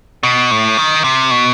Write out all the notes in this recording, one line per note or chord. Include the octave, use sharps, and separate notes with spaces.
B2
A2
D#3
C3
B2